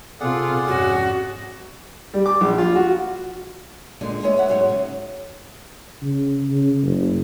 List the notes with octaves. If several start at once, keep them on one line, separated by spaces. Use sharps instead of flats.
C3 C4 F4 G#4 A4 D5 F#5
F2 G#2 C#4 F#4
G3
D6
A#1
F4
F#4
A#2 D3 G#3 D4 F4
G#3 B3 C#5 D#5 E5
C#5 E5 F#5
G#2 F#3 G#4 C#5
C#3
C#3
C#3
F#1